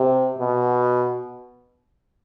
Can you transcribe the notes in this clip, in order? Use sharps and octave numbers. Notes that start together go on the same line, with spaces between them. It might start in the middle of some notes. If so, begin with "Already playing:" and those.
Already playing: C3
B2